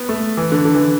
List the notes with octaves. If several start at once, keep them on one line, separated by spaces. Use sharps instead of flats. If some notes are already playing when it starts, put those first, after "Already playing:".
Already playing: B3
A3
E3
D3
D3
E3